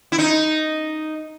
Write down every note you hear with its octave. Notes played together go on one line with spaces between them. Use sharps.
E4
D#4